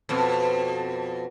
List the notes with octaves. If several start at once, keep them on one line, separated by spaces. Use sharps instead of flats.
F2 B2